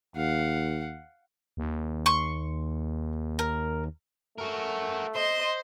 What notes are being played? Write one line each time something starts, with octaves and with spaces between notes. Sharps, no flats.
D#2 F5 F#5
D#2
C6 C#6
A#4
A3 F#4 A#4
C5 D#5 C6